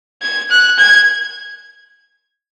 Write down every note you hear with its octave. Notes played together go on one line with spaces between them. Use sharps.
G#6
F#6
G#6